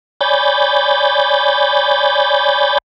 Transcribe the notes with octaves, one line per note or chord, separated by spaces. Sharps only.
C#5 D5 G#5 B5 G6 A6